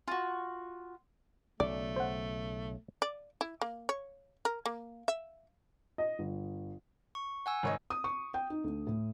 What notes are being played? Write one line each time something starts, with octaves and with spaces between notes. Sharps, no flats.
F4 F#4
B1 C#3 A3 D5
C5 F#5
D5
E4
A#3
C#5
A#4
A#3
E5
D#5
G1
C#6
F#5 G#5 E6
G#1 C#5 D#5
D#6
C#6
G5
D#4
D2
A2